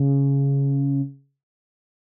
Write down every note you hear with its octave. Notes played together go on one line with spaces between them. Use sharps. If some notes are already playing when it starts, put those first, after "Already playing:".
Already playing: C#3